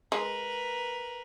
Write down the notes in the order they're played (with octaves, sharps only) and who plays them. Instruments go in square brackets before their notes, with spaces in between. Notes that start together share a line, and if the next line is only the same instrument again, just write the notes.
[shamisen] G#3 [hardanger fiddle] A#4 B4